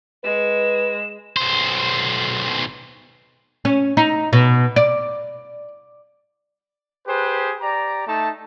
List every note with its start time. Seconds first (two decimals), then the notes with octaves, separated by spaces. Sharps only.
0.24 G#3 B4 E7
1.37 B1 C5
3.65 C#4
3.97 D#4
4.33 B2
4.76 D5
7.07 G4 G#4 B4 C5
7.60 G4 D5 A#5
8.07 A3 D#4 A5